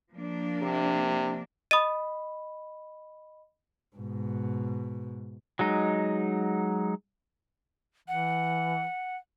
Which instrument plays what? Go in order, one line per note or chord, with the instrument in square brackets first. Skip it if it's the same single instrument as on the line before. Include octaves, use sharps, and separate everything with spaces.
[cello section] F3 A#3 D4
[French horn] C3
[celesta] D#5 B5 [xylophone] D#6 A6 D#7
[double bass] G#2 B2
[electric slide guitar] F#3 G#3 D#4
[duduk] E3 [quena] F#5